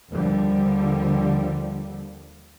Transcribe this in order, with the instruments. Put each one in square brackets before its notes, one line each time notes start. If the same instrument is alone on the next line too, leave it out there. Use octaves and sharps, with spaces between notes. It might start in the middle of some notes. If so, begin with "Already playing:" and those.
[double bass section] D#2 D3 F3 G3